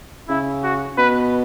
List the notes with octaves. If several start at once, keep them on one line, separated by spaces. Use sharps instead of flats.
C#3 E4
F#4
B2 B4